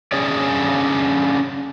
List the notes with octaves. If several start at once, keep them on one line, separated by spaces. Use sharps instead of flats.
C#4 D4 G#4 C#5 D5